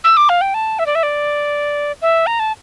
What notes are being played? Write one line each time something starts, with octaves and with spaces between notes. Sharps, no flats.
E6
D6
F5
G5
A5
E5
D5
E5
D5
E5
A#5
A5